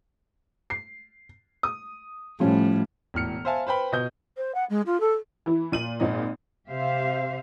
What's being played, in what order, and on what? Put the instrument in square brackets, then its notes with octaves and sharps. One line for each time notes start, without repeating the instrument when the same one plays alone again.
[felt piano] C7
D#6
[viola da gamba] A2 [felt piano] F3 G3 C#4
[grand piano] E1 A2 F6 C#7
C5 E5 F5 G#5 A5
B4 C5 G5 B5
B2 D#5 G6
[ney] C5
F#5
G#3
F4
A4
[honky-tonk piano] E3 E4
A#2 D#7 F#7
G#1 A#2 D#5
[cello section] C3 G4 C5 E5 F5